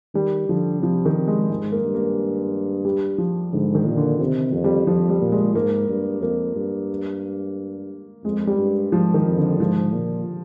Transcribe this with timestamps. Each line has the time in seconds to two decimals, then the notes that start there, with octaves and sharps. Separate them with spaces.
0.14 D#3 G3
0.49 D3 F3
0.82 C3 F3
1.05 D#3
1.16 C3
1.27 G#3
1.50 G#2 G#3
1.72 A#3
1.83 G2
1.95 A#3
2.85 G3
3.18 F3
3.53 G#2 D3
3.75 D#3
3.85 A#2
3.97 D3
4.20 C3 D#3
4.53 F2
4.64 G3
4.87 F2 F3
5.09 G3
5.21 A#2
5.32 G#3
5.55 G#2 A#3
5.89 G2
6.23 F2 A#3
6.55 G2
8.24 F2 G#3
8.47 G3
8.58 G2
8.92 G#2 F3
9.14 D#3
9.27 F2
9.38 D3
9.59 G#2 F3
9.93 A#2